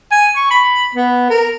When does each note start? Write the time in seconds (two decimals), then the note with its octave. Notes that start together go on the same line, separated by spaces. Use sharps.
0.12 G#5
0.36 C#6
0.51 B5
0.95 B3
1.30 A#4